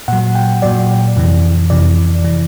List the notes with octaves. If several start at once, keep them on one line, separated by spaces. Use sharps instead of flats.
A#2 F#3 F#5
G5
A#2 F#3 D5
F2 C3 E3
F2 C3 E3 D5
E3